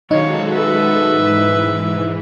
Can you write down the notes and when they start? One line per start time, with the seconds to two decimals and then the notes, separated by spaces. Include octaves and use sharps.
0.11 B1 D#3 G#3 D#4 F#4 A4 C#5 F5
0.53 B4 E5
1.11 G#2 E3